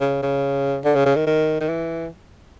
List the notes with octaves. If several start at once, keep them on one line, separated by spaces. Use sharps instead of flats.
C#3
C#3
D3
C#3
C#3
D#3
D#3
D#3
E3